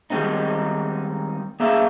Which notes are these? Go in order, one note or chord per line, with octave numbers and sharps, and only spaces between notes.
D#3 G3 G#3 C4 D#4
A#3 G#4 E5 F5 A#5